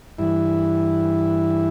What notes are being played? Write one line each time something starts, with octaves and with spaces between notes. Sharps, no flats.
G2 E3 E4